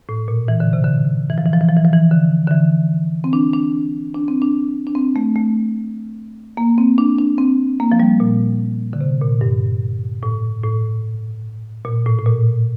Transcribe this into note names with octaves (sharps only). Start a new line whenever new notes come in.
A2
A#2
E3
D3
C3
D3
E3
F3
E3
F3
E3
F3
E3
F3
E3
D3
D3
E3
C4
D4
D4
D4
C4
D4
D4
C4
A3
A3
A#3
C4
D4
D4
C4
A#3
F3
G3
A#2
D3
C3
A#2
G2
A2
A2
A#2
A2
A2
A#2